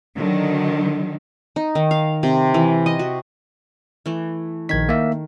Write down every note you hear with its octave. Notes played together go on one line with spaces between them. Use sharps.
D3 D#3 F#3
D#4
D#3
F5
C3
E3
D#5
F#4
E3 A3
A#1 D#3 G#6 B6
A#3 E5